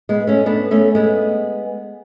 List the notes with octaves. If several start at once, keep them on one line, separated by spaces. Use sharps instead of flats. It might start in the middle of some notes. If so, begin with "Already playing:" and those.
G#3 B3
A3 C#4
B3 D4
A3 C#4
G#3 B3